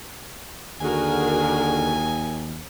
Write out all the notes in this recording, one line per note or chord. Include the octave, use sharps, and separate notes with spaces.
D#2 D3 F#4 G#4 A#4 G#5